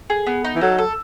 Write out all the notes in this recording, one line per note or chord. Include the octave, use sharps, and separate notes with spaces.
G#4
B3
D#4
E3
F#3 A4
A4